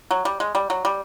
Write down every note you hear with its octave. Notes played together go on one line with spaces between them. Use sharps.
F#3
G3
G#3
G3
F#3
G3